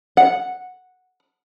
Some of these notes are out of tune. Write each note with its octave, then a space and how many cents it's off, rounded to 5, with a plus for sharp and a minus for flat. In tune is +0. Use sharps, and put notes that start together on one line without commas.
F#5 -10